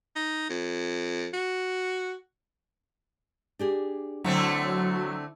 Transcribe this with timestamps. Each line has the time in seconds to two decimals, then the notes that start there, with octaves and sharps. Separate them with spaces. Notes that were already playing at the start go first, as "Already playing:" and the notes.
0.16 D#4
0.49 F2
1.33 F#4
3.59 D4 G4 G#4
4.24 D3 F#3 A3 C4 E4